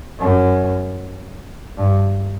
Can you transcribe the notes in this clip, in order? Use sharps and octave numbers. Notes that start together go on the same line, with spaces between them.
F#2
G2